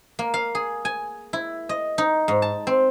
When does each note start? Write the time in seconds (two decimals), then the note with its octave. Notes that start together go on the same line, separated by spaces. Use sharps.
0.19 A#3
0.34 F5
0.55 G#4
0.85 G#5
1.33 E4
1.69 D#5
1.98 D#4
2.28 G#2
2.42 A5
2.67 C4